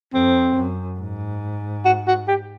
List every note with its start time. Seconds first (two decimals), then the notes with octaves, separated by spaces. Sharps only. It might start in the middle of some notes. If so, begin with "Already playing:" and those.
0.13 F2 C4
0.56 F#2
0.99 G#2
1.85 F#4
2.07 F#4
2.28 G4